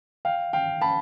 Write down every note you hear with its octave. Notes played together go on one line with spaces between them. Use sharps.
F5 G5
F5 G5
A5 B5